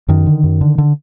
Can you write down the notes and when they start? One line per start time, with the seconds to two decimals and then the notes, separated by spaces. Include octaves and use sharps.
0.08 F#2 D#3
0.26 D3
0.44 F#2
0.61 D3
0.78 D3